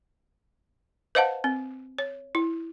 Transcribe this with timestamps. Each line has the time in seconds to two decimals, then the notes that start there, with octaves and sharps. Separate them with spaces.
1.15 B4 C5 D#5 F5 F#5 A5
1.44 C4
1.98 C#5
2.35 E4